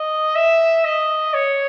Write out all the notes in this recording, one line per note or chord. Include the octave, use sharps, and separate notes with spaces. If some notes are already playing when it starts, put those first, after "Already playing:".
Already playing: D#5
E5
D#5
C#5